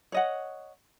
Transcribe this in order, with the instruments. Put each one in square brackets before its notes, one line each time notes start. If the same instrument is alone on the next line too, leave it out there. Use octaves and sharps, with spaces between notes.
[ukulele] C#5 D#5 F#5